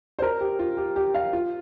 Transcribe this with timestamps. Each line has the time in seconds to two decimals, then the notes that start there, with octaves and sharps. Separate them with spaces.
0.19 C5
0.22 A#4
0.41 G4
0.59 F4
0.77 G4
0.96 G4
1.14 F5
1.33 F4